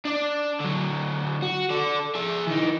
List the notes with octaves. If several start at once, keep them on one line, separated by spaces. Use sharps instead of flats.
D4 D5
D3 F#3
F#4
A4 D5
G#4 E5
E3 D#4